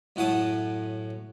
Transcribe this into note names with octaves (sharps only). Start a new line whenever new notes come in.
F#2 A2 F#5 A5 D#6